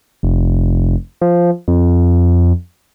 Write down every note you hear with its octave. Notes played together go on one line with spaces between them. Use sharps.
F1
F3
F2